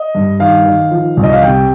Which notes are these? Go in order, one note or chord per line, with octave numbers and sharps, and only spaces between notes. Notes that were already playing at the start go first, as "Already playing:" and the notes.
Already playing: D#5
G2
D#3 F5
D#3
F3
C2
D#5
F5
C3 G5